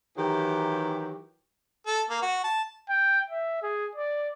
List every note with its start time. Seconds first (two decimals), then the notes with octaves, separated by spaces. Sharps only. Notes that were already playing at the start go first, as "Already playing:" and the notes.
0.18 D#3 E3 F#3 G4
1.86 A4
2.10 A#3
2.22 F#4
2.44 A5
2.89 G5
3.30 E5
3.63 G#4
3.96 D5